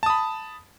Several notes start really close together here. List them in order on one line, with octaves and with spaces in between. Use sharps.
A5 D#6 B5